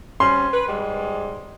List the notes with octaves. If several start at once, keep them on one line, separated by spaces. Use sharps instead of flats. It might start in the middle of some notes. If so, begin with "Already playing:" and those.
G3 C4 C#4 C6
B4
G#2 G3 G#3